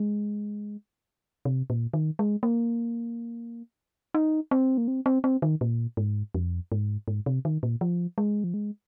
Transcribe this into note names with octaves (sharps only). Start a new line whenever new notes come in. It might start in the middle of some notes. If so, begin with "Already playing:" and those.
Already playing: G#3
C3
A#2
D#3
G#3
A#3
D#4
C4
A#3
C4
C4
C4
D#3
A#2
G#2
F2
G#2
G#2
C3
D#3
A#2
F3
G#3
F3
G#3